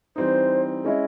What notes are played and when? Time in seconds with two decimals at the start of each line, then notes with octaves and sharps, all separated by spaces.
0.16 E3 G3 C4 D#4 C5
0.85 G#3 C#4 E4 D#5